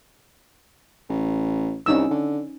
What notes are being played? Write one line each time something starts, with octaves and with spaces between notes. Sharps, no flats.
A1
C2 C#4 D#4 E6
D3